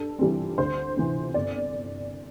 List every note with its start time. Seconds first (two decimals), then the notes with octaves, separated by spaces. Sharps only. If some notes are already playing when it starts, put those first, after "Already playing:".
Already playing: G2 A4
0.19 E3 G3 C4
0.58 D2 C5
0.97 C3 E3 C4
1.34 G1 D5